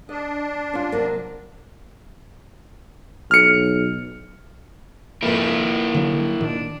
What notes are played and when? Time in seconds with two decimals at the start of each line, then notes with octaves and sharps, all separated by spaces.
0.09 D4 D#5
0.73 C#4 F4
0.92 C3 F#3 A#3
3.31 B1 F6 C#7
5.22 F2 G#2 A#3 E4 B4
5.54 D#3
5.94 D3 F#3
6.41 A#2 D#3 D4